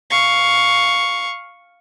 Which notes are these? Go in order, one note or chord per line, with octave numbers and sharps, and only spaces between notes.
F5 C#6